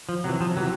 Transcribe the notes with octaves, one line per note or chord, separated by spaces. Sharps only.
F3
C3 E3 F#3
F3
C3 E3 F#3